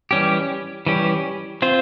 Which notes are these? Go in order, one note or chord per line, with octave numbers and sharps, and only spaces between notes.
E3 G3 C#4 G4
E3 G3 C#4 G4
C4 F4 C5